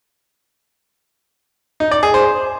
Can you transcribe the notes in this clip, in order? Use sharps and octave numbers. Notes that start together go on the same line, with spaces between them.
D#4
D5
G#4
C5